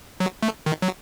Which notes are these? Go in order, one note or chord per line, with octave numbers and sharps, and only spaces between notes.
F#3
A3
D#3
F#3